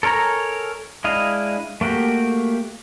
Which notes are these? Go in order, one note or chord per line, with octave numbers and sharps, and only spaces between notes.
A4 A#4 C#5 G#5 A#5
G#3 D4 E4 D#5 F5
A3 A#3 F#4 G4